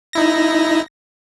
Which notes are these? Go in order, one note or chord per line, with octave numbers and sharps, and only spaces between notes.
D#4 E4 A#6